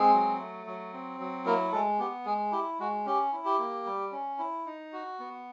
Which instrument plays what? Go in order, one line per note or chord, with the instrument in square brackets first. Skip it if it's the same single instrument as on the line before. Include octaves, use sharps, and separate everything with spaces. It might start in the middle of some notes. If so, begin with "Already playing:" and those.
Already playing: [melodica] G#3 C4 G#4
F#3
A3
F#3
C4
F#3
A#3 E4 A#4
G#3 A3 A4
B3 G4
G#3 G#4
E4 G4
G#3 F#4
C#4 G4
E4
G4
A#3
G3
C#4
E4
D#4
F#4
B3